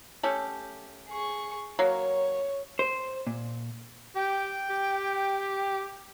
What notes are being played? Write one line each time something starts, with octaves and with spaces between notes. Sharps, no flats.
A3 C#4 G4
G#4 C#6
F#3 A#3 C#5
C5
A#2
G4 G5
G4